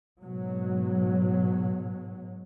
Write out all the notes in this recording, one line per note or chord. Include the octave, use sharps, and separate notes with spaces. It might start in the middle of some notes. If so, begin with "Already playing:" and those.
G#2 B2 F#3